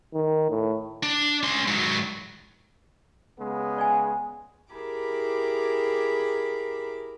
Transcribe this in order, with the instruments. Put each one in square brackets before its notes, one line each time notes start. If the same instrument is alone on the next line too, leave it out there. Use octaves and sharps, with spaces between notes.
[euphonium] D#3
A2
[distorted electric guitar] D4
C#4 C6
G#2 F#3
[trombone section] C#3 G#3 B3
[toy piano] D5 G#5
[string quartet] E4 G4 G#4 A#4 B5 D6